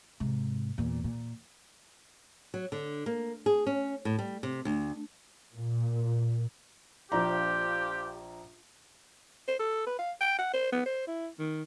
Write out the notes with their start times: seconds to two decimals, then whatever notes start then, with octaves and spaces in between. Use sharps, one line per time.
0.20 G#2 C3
0.78 E2 A#2
1.04 A#2
2.54 F#3
2.72 D3
3.06 A#3
3.46 G#4
3.66 C#4
4.05 A2
4.19 G3
4.43 C3
4.65 D2
5.54 A#2
7.12 A#1 F3 D4 F4 G4 A#5
9.48 C5
9.60 A4
9.86 B4
9.99 F5
10.21 G5
10.39 F#5
10.53 C5
10.72 B3
10.86 C5
11.08 E4
11.39 D#3